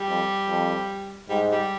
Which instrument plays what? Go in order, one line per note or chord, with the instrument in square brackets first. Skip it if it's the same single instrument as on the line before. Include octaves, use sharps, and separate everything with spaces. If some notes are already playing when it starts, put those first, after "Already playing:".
Already playing: [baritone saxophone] G3
[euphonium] F2
F2
[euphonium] G#2 [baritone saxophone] G3
[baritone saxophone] G3